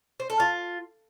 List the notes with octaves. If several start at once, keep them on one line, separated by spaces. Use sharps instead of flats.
C5
A4
F4